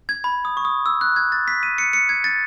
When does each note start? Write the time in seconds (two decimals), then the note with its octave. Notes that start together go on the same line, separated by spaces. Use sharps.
0.09 G#6
0.24 B5
0.45 D#6
0.57 C#6
0.65 D#6
0.86 E6
1.01 F#6
1.16 G#6
1.32 A6
1.48 B6
1.63 D#7
1.78 C#7
1.93 C#7
2.09 G#6
2.24 A6